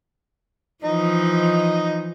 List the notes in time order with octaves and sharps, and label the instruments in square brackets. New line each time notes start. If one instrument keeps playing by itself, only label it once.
[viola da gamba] E3 F3 [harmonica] D#4 D#5